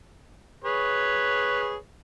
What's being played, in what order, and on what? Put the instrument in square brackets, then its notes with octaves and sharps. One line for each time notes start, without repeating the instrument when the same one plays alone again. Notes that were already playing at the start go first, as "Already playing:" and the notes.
[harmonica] G#4 B4 C#5